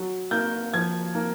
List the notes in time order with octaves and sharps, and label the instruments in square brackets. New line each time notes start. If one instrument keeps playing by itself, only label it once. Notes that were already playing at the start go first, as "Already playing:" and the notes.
Already playing: [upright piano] F#3
A#3 G6
F3 G#6
A#3